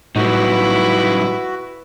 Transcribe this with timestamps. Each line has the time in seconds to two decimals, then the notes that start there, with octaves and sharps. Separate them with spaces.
0.16 A2 F#3 G3 D#4 E4 F#4 B4